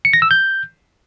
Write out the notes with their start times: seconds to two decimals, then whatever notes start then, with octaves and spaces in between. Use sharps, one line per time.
0.05 C#7
0.13 A#6
0.22 E6
0.31 G6